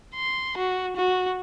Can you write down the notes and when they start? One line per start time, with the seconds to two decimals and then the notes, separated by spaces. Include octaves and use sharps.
0.15 C6
0.57 F#4
0.97 F#4